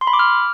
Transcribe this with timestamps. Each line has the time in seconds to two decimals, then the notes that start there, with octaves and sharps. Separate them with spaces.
0.01 C6
0.07 B5
0.13 D6
0.19 F6